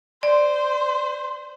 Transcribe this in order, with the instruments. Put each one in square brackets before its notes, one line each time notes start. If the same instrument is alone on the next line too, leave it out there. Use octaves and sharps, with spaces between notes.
[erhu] C5 [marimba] D5